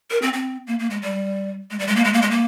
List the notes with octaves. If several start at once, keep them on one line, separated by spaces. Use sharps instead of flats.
A#4
C4
C4
A#3
A#3
G#3
G3
G#3
G3
G#3
A#3
G#3
A#3
G#3
A#3